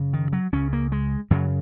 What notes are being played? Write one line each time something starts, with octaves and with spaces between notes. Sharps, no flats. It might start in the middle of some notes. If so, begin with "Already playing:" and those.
Already playing: F#2 C#3
D#3
F#3
C#2 C#3 C#4
A#3
G#3
F#2 C#3 F#3